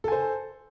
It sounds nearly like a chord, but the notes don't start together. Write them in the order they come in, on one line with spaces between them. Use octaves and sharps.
A4 G#5 C5